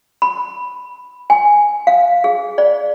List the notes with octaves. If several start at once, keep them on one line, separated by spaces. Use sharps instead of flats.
B5
G#5
F5
G#4
D5